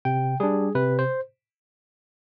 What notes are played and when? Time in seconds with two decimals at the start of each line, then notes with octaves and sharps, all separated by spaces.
0.05 C3 G5
0.40 G3 D4 G#4
0.75 C3 B4
0.99 C5